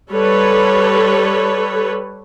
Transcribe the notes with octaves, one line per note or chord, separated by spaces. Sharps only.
G3 A4 B4 C#5